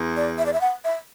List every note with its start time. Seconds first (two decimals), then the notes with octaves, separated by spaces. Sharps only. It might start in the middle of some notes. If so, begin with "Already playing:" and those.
Already playing: E2
0.17 D5
0.38 E5
0.46 D5
0.53 E5
0.61 F#5
0.84 E5